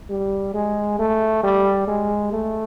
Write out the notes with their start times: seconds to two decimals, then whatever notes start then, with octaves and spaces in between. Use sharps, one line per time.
0.10 G3
0.54 G#3
0.99 A3
1.43 G3
1.87 G#3
2.33 A3